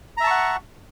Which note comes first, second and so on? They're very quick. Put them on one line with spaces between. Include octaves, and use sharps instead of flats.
A#5 E5 A5 C#6 F#5